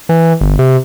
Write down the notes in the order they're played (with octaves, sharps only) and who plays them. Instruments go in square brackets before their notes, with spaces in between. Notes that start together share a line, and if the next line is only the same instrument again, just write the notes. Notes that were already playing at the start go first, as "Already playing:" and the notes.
[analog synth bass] E3
G1
C3